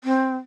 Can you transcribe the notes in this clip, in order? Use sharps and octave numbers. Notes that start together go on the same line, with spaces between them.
C4